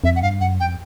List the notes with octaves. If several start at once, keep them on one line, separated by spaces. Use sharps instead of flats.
F2 E5
F#5
G2 F5
F#2 F#5
F2 G5